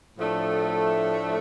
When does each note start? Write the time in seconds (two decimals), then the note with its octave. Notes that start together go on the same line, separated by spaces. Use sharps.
0.17 A2 F3 A3 D4